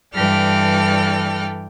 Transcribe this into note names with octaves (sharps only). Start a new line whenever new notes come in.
G2 E3 A4 D5 G5 F6